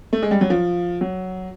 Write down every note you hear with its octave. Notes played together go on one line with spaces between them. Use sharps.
A3
G#3
G3
F#3
F3
F#3